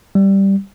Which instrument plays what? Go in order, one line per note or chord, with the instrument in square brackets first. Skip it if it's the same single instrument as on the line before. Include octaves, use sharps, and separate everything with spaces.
[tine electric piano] G3